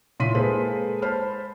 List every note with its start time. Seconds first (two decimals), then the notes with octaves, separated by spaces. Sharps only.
0.20 A#2 E4 C#5 C6 B6 D#7
0.35 G#3 A#3 G#4 A4 B4 C5
1.02 C5 A5 B5 F6